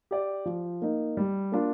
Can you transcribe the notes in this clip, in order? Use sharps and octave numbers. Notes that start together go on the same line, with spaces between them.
G4 D5
F3
A#3 D#4
G3
A#3 D4 F4